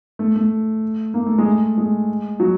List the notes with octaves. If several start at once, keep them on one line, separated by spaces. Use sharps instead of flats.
A3
A3
A#3
A3
G#3
A3
G#3
F#3